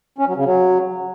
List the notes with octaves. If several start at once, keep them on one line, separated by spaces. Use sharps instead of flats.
C#4
F#3
C#3
F#3